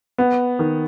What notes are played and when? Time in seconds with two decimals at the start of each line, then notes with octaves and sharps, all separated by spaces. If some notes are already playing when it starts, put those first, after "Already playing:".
0.18 B3
0.59 D#3